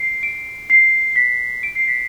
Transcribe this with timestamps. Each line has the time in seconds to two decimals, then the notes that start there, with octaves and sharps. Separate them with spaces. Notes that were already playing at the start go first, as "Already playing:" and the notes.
Already playing: C7 D7
0.23 D7
0.70 C7
1.16 B6
1.63 D7
1.75 C7
1.88 B6